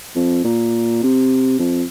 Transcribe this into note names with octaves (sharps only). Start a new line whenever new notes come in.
F2
A#2
C3
F2